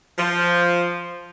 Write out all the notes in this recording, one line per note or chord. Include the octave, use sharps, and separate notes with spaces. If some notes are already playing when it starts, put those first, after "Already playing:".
F3